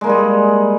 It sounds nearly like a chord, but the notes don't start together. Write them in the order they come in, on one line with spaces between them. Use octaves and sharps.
G#3 A#3 G3 G#4